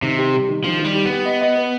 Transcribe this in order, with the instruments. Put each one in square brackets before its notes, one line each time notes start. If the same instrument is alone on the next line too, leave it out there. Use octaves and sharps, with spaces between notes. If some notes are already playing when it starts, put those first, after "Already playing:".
[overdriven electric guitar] C3 [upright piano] D#3
[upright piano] G4
G3
D#3
[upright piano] D#3 [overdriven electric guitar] F3
[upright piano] D#3
[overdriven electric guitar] G3
[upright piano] G4
[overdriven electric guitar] B3
[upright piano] G4
D#5
D#5
B4